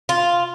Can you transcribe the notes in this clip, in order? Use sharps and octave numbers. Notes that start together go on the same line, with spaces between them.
F4